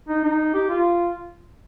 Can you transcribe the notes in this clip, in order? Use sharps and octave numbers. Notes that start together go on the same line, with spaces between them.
D#4
D#4
G4
F4